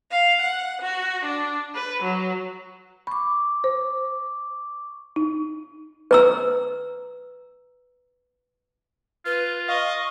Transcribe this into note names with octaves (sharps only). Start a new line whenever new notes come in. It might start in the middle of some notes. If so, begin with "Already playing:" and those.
F5
F#5
F#4
D4
B4
F#3
B5 C#6 D6
C5
D#4
B4 A#5 E6
F4 B4
D#5 F5 C#6